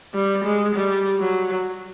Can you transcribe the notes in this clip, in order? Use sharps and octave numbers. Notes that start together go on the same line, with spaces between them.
G3
G#3
G3
F#3